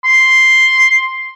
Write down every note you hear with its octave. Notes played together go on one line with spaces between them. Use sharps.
C6